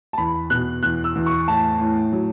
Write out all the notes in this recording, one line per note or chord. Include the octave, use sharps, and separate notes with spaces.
A5
E2 B5
B2 F#6
E2 F#6
E6
E2
C#6
A2 A5
A2
F#3